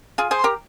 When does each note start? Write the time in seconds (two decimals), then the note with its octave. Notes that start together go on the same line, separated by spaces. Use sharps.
0.18 F4 G#4
0.31 G#4 C5
0.38 C6
0.44 G4 A#4